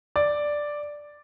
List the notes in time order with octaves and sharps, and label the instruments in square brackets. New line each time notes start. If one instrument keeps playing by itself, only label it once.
[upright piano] D5